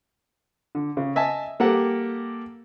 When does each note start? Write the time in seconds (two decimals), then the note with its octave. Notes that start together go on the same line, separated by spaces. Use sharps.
0.75 D3
0.97 C#3
1.16 D#5 E5 G#5 A5
1.60 G3 A#3 G4 A4 A#4 F#5